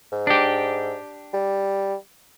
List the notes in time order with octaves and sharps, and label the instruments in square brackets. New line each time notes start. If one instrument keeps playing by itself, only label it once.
[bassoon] G#2
[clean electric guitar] D4 G4
[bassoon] G3